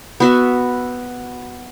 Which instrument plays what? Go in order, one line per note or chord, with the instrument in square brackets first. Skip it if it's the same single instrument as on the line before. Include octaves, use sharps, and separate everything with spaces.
[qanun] B3 F#4 E5